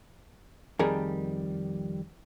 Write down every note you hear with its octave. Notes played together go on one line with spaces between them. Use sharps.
F2 D#3 G3 G#4 A#4